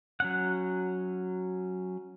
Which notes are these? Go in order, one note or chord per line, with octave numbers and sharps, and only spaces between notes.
F#3 C#4 F#5